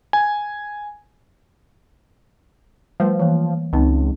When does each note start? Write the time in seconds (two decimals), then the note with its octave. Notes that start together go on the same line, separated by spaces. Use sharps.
0.13 G#5
3.00 F3 G3 A3 B4
3.20 E3 A#3
3.73 C#2 C4 D#4